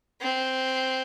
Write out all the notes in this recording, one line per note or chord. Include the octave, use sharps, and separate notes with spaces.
C4